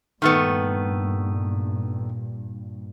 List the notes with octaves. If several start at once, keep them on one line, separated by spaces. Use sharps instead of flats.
G2 A#2 D#3 A3 B3